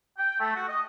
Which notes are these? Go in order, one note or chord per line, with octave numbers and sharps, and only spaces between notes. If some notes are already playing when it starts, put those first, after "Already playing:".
G5
A3
F#4
D#5